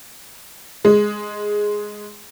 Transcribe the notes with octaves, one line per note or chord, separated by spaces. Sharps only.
G#3